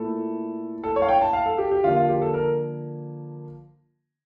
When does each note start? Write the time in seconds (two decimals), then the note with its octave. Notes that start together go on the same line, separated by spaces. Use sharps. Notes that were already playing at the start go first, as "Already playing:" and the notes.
Already playing: A#2 A3 E4 A4
0.84 A4
0.96 C#5
1.02 F5
1.09 G5
1.21 A5
1.33 F5
1.46 A4
1.58 G4
1.71 G4
1.84 D3 F3 A#3 F4
1.96 F4
2.09 G4
2.22 A4
2.34 A#4